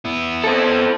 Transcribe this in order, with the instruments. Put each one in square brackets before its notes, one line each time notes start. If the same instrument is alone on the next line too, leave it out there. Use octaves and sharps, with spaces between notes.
[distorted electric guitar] B3 E4
[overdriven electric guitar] C4 A4